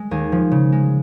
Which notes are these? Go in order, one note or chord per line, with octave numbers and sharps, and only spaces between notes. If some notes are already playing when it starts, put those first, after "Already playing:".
Already playing: G#3
D#2 G#4
F3
C#3
G#3